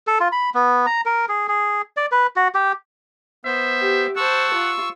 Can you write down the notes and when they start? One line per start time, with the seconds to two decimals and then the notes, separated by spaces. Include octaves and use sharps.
0.07 A4
0.20 F4
0.32 B5
0.54 B3
0.86 A#5
1.06 A#4
1.29 G#4
1.48 G#4
1.97 D5
2.12 B4
2.36 F#4
2.54 G4
3.45 B3 C5 E5
3.80 G4
4.17 C5 F#5 A5 C#6 E6
4.53 F4